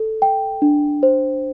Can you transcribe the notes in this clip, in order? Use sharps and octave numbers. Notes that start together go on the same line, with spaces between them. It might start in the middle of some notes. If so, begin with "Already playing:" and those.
Already playing: A4
G5
D4
C5